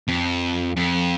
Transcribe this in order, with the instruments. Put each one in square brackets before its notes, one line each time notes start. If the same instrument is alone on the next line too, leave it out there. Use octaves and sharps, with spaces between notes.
[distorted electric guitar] F2
F2